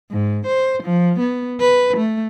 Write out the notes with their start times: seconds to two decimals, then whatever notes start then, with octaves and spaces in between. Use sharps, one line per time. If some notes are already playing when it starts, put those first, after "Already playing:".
0.11 G#2
0.46 C5
0.83 F3
1.19 B3
1.60 B4
1.97 A3